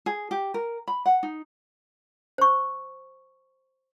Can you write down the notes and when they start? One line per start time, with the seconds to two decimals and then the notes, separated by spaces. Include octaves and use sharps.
0.06 G#4
0.31 G4
0.54 A#4
0.88 B5
1.06 F#5
1.23 D#4
2.38 C5 C#6